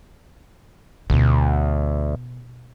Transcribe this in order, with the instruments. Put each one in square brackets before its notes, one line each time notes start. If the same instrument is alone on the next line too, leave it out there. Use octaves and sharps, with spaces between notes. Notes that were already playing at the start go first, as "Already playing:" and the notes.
[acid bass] D2 [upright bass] B2